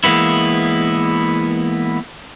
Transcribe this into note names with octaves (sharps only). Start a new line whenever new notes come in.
E3 G#3 A#3 B3 E4